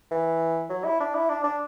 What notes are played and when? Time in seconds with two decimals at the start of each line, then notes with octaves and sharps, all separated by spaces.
0.11 E3
0.70 F#3
0.85 E4
1.00 D4
1.15 E4
1.30 D4
1.44 D4